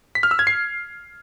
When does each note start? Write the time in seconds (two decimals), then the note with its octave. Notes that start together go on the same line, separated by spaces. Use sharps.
0.15 B6
0.23 F6
0.31 E6
0.39 G#6
0.47 C7